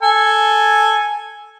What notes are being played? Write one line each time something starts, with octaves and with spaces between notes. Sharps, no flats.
A4 G#5